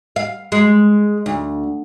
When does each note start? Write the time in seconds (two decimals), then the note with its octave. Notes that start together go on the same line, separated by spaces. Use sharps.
0.16 F5
0.52 G#3
1.26 D2